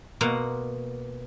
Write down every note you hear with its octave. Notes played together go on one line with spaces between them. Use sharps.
B2 A#3 F#5 C6